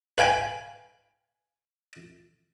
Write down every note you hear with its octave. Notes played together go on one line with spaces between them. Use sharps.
B4 F5 G5 G#5 B5